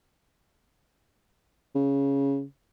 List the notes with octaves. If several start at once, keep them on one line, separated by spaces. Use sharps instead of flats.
C#3